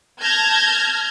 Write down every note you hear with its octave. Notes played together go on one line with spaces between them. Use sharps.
A5 F6 G6 G#6 A#6